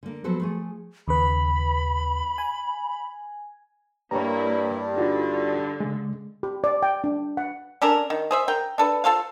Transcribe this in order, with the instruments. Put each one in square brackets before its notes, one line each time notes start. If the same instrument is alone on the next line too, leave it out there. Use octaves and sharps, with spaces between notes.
[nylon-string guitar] D3 A#3
F3 F#3 B3 A4 B4 C5
F3 A3 G#4
[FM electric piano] D#2 C#3 B4 [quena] B5
[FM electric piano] G#5
[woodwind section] G2 [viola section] A#3 E4 [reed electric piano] C#5 A#5
[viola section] D3 [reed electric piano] D#4 F4 F#4
[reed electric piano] C#3 G#3
[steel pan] G4
D5
G5
D4
F#5
[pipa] C#4 D4 A4 A#4
D#3
G#4 C5 E5
A#4 G5
D4 A4 B4
F4 A4 C5 F5